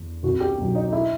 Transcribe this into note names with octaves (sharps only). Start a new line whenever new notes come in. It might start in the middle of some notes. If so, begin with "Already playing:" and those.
Already playing: E2
C2 F#4
G4
B2 F#3
D#4
E4